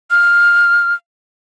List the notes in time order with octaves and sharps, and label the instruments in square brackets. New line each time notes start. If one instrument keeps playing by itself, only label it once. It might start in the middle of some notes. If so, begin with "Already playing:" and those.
[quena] F6